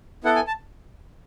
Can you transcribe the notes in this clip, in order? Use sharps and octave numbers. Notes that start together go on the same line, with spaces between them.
B3 E4 A4 F#5
G#5
A5